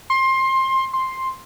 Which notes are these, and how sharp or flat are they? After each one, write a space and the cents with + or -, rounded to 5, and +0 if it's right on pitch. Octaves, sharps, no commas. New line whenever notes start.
C6 +20
C6 +5